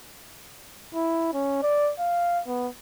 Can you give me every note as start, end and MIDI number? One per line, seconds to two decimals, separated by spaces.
0.94 1.29 64
1.33 1.60 61
1.63 1.91 74
1.99 2.41 77
2.47 2.68 59